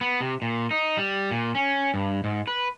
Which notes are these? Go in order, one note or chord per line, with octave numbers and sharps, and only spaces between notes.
B3
C3
A#2
D#4
G3
A#2
C#4
G2
G#2
B4